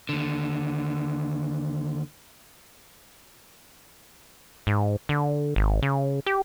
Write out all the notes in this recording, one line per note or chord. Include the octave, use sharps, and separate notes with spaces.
D#2 D3
G#2
D3
G#1
C#3
G4